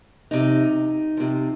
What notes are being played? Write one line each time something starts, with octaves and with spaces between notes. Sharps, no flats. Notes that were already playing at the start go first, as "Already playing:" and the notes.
C3 F3 D#4
C3 F3